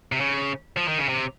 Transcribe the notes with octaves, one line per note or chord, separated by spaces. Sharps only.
C3
C#3
F3
D#3
C#3
C3